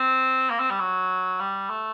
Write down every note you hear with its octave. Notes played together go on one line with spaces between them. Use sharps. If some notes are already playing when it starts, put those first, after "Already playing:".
Already playing: C4
A#3
C4
G3
F#3
G3
A3